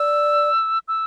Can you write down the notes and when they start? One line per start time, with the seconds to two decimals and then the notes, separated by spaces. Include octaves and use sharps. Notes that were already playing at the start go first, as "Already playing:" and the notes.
Already playing: D5 E6
0.88 E6